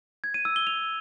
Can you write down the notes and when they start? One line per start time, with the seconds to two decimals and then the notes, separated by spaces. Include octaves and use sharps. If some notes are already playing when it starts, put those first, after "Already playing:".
0.24 G#6
0.34 D#7
0.45 E6
0.56 G7
0.67 F7